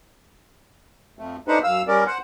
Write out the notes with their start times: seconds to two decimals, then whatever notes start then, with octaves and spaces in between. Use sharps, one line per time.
1.19 F2 A3
1.48 A3 D4 D#4 B4 C5 F#5
1.63 F#2 F5 E6
1.88 G3 C#4 A#4 D5
2.07 C5 F#5